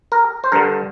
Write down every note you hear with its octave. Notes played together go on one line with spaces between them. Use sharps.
A#4
C5
G2 D3 A#4